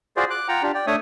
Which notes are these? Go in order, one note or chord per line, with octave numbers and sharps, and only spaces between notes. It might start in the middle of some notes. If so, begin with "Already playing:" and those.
F4 F#4 G#4 C5 D5
D6 F#6
F4 F#5 G5 A#5
D4 F4 G4
D5 G5
A3 D4 C#5 E5 D#6